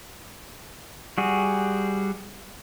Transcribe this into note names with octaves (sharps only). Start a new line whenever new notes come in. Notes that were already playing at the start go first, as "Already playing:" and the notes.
G3 F#4 G#4